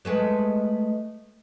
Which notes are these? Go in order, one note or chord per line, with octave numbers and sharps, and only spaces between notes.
G#3 A3 B3